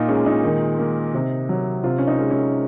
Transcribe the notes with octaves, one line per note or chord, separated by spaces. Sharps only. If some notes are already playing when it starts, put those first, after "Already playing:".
Already playing: A#2 D#4 F4
G#3 C#4
D#4
D#3
A#3
C3
F#3
C3 F4
C#4
D#4
G#3
C#4